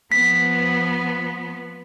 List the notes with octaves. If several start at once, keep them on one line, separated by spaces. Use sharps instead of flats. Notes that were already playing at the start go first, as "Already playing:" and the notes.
F3 B3 B6